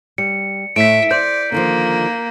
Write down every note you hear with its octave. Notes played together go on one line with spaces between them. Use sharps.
G3 C#7
A2 E5 B6 D7
C5 D5 G6
D3 D#3 F3 A#3